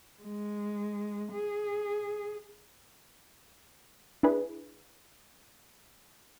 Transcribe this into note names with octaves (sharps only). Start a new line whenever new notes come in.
G#3
G#4
D4 E4 G#4 B4